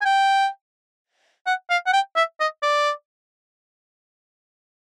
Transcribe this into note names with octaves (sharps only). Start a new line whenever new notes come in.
G#5
G5
F#5
F5
F#5
G5
E5
D#5
D5